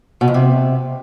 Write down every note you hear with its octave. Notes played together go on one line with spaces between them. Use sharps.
B2
F2
C3